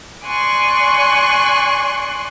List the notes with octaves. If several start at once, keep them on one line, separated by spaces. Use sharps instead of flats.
D5 G#5 C6 C#6 F#6